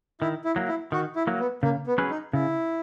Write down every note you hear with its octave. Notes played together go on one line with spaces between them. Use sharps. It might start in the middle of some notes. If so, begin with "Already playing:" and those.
D#3 E4
E4
F#3 A#3
E4
D#3 F#4
E4
F#3 A#3
B3
C#3 A#3
B3
F#3 C#4 G#4 B4
D#4
C#3 E4